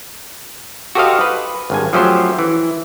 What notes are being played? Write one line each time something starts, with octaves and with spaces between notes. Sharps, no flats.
F#4 G4 A4 C5 D#5 F5
B4
G#1 G2 G#5
F3 F#3 A3 C#4 G4 C5
E3